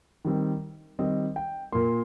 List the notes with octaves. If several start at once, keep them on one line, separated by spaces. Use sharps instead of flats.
D#3 G3 C4
D#3 G3 C4 D#5
G5
A#2 A#3 C6